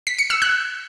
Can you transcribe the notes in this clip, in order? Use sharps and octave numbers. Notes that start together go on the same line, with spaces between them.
B6
C#7
E6
F#6